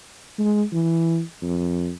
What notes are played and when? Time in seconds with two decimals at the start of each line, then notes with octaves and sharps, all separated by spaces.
0.39 G#3
0.73 E3
1.43 F2